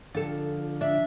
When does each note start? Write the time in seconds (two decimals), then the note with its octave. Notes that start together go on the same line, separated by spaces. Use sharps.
0.15 D3 F3 F4 A4
0.81 D4 E5